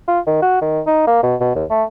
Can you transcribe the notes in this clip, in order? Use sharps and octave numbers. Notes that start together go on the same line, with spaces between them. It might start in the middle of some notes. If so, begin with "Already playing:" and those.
F4
D#3
F#4
D#3
D#4
A#3
B2
B2
D#2
A3